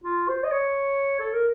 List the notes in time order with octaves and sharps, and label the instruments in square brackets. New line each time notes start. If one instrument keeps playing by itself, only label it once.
[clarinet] F4
C5
D#5
C#5
A4
A#4